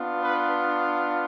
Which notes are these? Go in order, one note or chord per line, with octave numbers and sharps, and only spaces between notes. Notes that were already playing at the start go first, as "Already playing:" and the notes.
Already playing: B3 D4 F4
B4